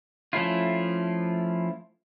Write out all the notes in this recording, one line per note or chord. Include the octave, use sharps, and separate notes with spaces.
F3 A3 C#4 E4 F4